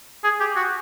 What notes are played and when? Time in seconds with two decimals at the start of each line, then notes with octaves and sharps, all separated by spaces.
0.24 G#4
0.40 G4
0.56 F#4